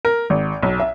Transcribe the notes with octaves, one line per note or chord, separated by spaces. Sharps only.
A#4
G#1
B1
E5